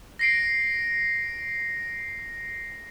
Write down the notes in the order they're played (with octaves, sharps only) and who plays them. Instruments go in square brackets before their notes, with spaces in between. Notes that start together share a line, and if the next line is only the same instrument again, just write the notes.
[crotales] A#6 C7 D7